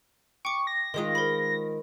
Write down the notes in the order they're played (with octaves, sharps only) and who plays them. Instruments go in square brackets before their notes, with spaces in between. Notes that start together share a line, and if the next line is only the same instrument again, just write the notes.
[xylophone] G5 D6 [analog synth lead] C#6
[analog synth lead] A#6
[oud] D#3 G#3 F4 [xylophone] C6 D#6
[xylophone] A#4 C5 B5